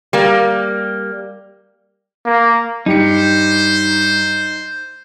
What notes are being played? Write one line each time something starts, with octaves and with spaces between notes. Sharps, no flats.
G3 A#3
A#3
G2 D#4 G4 C5 C#7